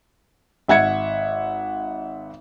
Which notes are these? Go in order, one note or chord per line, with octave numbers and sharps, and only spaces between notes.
G#1 E5 F#5 G#6 C#7